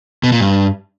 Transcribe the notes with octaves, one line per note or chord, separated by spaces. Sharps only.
B2
A#2
G2